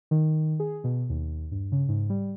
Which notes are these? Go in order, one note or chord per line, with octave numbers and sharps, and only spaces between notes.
D#3
G#4
B2
D#2
G2
C#3
G#2
G3